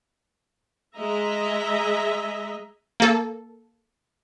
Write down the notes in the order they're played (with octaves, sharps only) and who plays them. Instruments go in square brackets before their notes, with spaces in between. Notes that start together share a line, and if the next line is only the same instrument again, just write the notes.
[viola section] G#3 G#4 D#5 E5 A#5
[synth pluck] A#3 A4